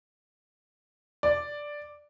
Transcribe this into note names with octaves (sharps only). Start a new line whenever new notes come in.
D5